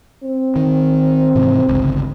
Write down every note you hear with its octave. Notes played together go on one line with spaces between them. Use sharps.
C4
D#3
G#2 C3 E3
G1 C#2